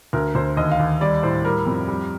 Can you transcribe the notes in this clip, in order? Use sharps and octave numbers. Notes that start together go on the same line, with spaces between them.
D2 A#4
D2 C5
D#2 D#5
F5
D#2
G3 D5
A2 C5
G3 A#4
F2
G3